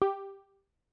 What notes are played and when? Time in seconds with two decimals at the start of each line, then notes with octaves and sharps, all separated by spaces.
0.02 G4